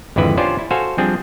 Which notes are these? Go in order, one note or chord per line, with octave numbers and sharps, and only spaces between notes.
G#1 F2 D3 E4 B4
C#4 D4 F4 G4 C5 D5
E4
F#4 A4 C5 F5 G#5
F3 G3 C4 D4 G#4